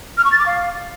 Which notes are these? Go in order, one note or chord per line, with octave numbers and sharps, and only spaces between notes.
F6
C#6
A6
D6
F5